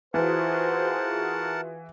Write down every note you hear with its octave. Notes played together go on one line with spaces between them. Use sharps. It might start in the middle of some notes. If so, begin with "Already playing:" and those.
E3 F4 F#4 G#4 A#4 C5 F#5 A5